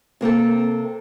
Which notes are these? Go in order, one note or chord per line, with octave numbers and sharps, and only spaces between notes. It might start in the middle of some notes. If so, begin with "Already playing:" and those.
C3 A#3 C4 A4